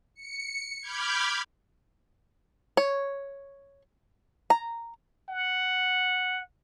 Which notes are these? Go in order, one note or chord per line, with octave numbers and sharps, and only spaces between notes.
C#7
B5 D6 F6 G6 G#6
C#5
A#5
F#5